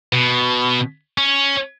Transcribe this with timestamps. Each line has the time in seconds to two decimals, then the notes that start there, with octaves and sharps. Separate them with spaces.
0.13 B2
1.18 C#4